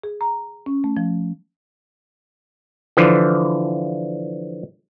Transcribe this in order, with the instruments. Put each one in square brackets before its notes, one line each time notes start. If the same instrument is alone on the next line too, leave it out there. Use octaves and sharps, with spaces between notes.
[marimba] G#4
A#5
C#4
A3
F3
[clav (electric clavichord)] D3 E3 F3